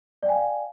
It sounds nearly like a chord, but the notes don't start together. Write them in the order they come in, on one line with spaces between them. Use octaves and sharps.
D5 G5 G#5 F5